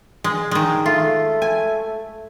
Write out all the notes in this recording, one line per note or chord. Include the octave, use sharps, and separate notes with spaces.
G#3
D#3 G#3
A3 F4
G#5